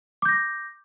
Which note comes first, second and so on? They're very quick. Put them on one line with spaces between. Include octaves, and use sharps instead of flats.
D6 G6 A#6